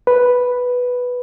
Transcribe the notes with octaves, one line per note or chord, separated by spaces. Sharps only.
B4